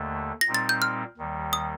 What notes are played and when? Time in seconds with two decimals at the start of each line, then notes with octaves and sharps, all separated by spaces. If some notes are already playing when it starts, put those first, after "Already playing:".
Already playing: D#2 D3 A3
0.41 A#6
0.47 A#2 G3 C4 D#4
0.54 A6
0.69 G6
0.82 F6
1.18 D#2 D#3 G3
1.53 D#6